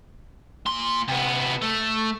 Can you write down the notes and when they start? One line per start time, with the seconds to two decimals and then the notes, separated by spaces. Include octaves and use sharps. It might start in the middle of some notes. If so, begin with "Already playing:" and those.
0.66 A#2 C6
1.08 C3 B3
1.62 A3